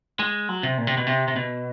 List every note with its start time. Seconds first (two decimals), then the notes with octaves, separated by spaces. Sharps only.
0.19 G#3
0.49 F#3
0.63 C3
0.78 A#2
0.87 C3
0.97 B2
1.07 C3
1.28 C3
1.36 B2